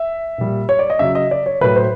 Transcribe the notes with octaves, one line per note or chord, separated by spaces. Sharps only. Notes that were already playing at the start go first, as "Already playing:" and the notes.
Already playing: E5
A#2 G3
C#5
D5
D#5
C#3 F#3 E5
D#5
D5
C#5
A2 F#3 B4
C5